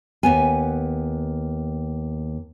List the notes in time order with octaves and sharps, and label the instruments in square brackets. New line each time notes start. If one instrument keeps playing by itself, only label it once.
[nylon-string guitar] D#2 B3 G#5